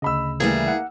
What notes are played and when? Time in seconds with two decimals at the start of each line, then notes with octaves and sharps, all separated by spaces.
0.02 D2 C#3 D#5 B5 E6
0.40 E3 G3 A3 A#3 G#4
0.68 F#5